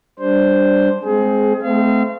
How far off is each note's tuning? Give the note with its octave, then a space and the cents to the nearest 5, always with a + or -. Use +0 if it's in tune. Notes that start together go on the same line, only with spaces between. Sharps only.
G3 +0 D4 -5 C5 +0
G#3 +15 C4 +0 G#4 +25
A3 -30 C4 -35 F5 -35